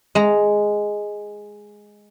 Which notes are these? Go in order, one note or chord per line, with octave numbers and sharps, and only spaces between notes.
G#3 A#5